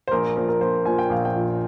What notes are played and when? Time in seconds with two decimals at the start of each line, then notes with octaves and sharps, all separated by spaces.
0.08 C5
0.11 A#1 A#4
0.37 A#2 F3 A#4
0.49 A#4
0.61 A#1 C5
0.86 A#2 F3 G#5
0.99 G5
1.10 A#1 F5
1.25 G5
1.35 A#2 F3